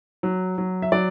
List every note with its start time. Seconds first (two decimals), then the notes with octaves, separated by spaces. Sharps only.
0.23 F#3
0.58 F#3
0.82 E5
0.92 F#3 D5